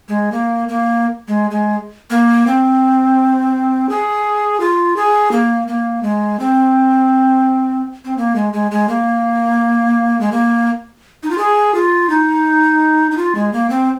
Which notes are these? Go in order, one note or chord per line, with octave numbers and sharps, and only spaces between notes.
G#3
A#3
A#3
G#3
G#3
A#3
C4
G#4
F4
G#4
A#3
A#3
G#3
C4
C4
A#3
G#3
G#3
G#3
A#3
G#3
A#3
D#4
F4
G#4
F4
D#4
D#4
F4
G#3
A#3
C4